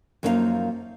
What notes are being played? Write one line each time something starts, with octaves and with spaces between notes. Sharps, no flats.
F#2 F3 A#3 D#4 G#4 F5